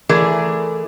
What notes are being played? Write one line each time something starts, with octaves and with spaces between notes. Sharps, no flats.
E3 A3 G#4 A#4 D5